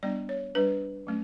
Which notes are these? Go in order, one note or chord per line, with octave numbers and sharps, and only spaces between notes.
G3 B3 D4 D5
C#5
G3 D4 B4
F#3 A3 C#4